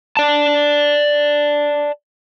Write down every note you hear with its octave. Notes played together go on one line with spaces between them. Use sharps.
D5 A5